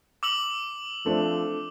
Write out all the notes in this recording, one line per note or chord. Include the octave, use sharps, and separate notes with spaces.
D6 E6 F#7
F3 A3 C4 D4